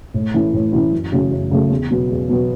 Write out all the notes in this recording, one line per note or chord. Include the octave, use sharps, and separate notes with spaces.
A2
E3 A3 C#4 E4
A2
E3 A3 C#4 E4
F#2
C#3 F#3 A3 C#4
F#2
C#3 F#3 A3 C#4
E2
B2 F#3 B3
E2
B2 F#3 B3